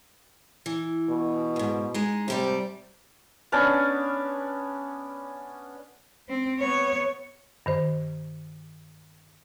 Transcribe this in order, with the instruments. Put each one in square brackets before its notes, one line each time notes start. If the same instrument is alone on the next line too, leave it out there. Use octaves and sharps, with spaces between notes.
[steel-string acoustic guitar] E3
[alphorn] B2
[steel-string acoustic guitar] D#2 G#2
G#3 D#4
[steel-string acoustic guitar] G#2 G3 D5 [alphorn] C3
[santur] B3 C#4 D4 D5
[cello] C4
B3 C#5
[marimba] G2 D#3 C5